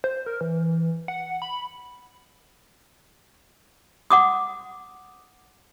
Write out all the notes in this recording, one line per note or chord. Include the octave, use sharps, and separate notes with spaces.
C5
A#4
E3
F#5
B5
F#5 D6 D#6